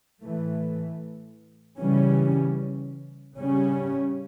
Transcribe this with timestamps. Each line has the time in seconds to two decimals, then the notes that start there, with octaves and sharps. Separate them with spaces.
0.22 A2 E3 A3
1.79 C#3 E3 G3 C#4
3.36 C#3 G3 C#4